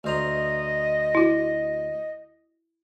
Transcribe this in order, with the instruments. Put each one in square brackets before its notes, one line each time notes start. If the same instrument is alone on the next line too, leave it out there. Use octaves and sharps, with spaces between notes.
[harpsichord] D2 C5 A#5 [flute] D#5
[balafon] E4 F#4